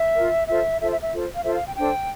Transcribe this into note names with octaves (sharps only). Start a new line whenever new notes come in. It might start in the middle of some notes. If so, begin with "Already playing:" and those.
Already playing: E5
F4 A#4
F4 A4 C5 E5
F4 A4 C5 E5
E5
E5
F4 A4 C5
F5
F4 A4 C5 E5
F5
G5
D4 A4 C5 G5